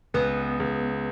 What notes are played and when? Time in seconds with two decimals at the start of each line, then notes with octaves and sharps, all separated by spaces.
0.14 C#2 B3
0.60 C#2